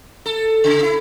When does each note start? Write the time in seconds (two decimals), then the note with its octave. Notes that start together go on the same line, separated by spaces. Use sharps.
0.26 A4
0.64 C#3
0.82 E4